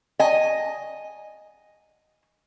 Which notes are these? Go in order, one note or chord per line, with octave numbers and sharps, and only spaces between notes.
D#5 G#5